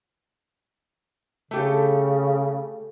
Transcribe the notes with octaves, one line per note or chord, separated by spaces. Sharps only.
C#3 A3 G4 A4